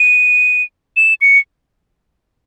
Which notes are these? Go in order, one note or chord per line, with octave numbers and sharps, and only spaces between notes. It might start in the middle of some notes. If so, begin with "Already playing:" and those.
Already playing: D#7
E7
C#7